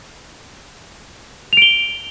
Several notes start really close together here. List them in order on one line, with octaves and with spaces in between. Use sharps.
F7 D7 G7